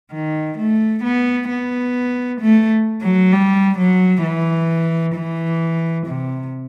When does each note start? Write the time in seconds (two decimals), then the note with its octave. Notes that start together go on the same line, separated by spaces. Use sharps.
0.12 D#3
0.58 A3
1.04 B3
1.49 B3
2.41 A3
3.02 F#3
3.32 G3
3.78 F#3
4.24 E3
5.15 E3
6.07 C3